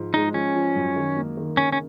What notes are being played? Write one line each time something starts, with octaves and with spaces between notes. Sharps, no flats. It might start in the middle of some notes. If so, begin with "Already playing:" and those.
Already playing: G#2 F3
G#3 D#4
F3 C#4
F3
F#2
D#3
A#3
D#3
C#3 C#4
C#4